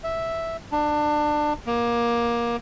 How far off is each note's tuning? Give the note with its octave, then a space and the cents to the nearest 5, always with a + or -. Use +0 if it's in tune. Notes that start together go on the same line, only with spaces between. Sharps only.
E5 -5
D4 +25
A#3 +20